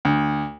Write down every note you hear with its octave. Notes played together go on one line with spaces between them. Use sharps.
D2